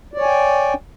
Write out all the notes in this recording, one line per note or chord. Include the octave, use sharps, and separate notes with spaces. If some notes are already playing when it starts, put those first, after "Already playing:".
C#5 D5 G5 G#5